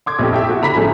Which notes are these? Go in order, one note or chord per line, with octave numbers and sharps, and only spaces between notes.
C6 D6 G#6
A#1 F2 G4
E4 G4 E5
F#4
D3 A#5 B5 B6
A2 F3 A3 C#4 E4 G#4